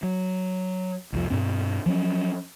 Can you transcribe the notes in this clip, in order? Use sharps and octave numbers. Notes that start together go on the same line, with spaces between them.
F#3
C2 F2 F3
G2 B2 C4
F3 F#3 C4 C#4